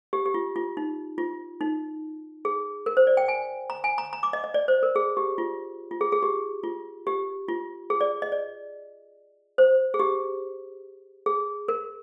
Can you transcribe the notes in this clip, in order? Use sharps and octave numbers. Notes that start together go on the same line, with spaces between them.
G4
G4
F4
F4
D#4
F4
D#4
G#4
A#4
C5
D5
G5
G#5
A#5
G#5
A#5
A#5
D6
D#5
D#5
D5
C5
A#4
G#4
G4
F4
F4
G#4
G#4
G4
F4
G4
F4
G#4
D5
D#5
D5
C5
G#4
G4
G#4
A#4